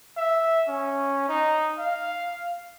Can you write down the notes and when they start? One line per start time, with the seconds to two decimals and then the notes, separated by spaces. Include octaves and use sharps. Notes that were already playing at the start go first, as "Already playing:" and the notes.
0.17 E5
0.68 C#4
1.29 D#4
1.78 F5